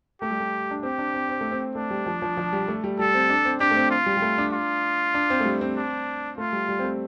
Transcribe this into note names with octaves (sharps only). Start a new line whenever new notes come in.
A3 G4
G3
A3
D4
C4 G4
D4
C4
C4
A3
C4
A3 D4
G3
F3
F3
F3
G3
A3
G3
G3 A4
C4
D4
C4
D4 G4
A3
C4
F4
G3
G3
A3
D4
F4
D4
C4
A3
G3
C4
D4
A3 F4
G3
G3
C4
A3